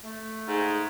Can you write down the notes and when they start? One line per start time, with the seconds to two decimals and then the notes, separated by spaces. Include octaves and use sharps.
0.03 A3
0.48 G#2